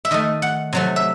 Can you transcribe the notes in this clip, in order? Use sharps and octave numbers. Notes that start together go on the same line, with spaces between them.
E5
D#3 A3 D#5
F#5
C3 F#3 A3
E5